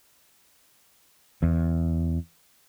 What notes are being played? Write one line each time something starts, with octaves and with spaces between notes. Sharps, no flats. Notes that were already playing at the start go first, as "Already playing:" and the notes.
E2